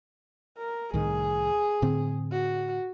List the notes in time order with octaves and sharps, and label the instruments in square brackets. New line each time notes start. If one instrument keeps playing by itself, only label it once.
[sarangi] A#4
[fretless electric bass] C2 A2 D#3 [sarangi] G#4
[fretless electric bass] A2 D3 C4
[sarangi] F#4